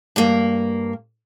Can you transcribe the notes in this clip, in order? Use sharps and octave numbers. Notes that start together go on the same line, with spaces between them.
G2 A#3